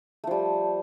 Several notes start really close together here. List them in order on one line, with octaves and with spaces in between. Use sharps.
A3 F3 G3